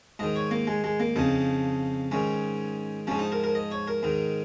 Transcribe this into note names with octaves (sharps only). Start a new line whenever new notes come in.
G#2 D#3 D#5
C#5
A#3
G#3
G#3
A#3
F2 C#3 F3 D#4
G#2 D#3 C#4
G#2 F3 C#4
D#4
A#4
A#4
D#5
C#5
A#4
G#2 D#3